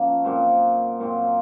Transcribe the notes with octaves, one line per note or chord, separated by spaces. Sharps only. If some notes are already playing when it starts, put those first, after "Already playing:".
Already playing: F3 A#3 C#4
A#2 F#3 C4
A#2 F#3 C4